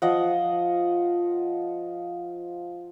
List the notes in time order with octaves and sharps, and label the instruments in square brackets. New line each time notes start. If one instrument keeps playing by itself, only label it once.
[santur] F3 D#5 F#5